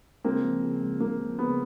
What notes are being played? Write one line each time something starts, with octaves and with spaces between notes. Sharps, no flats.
C#2 A#3 C4
F3
C#3
C#2
C#2 A#3
F3
C#3 B3